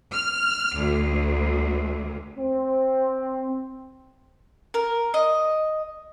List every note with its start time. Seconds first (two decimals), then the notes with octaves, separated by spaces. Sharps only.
0.12 F6
0.77 D2
2.38 C4
4.74 A#4
5.14 D#5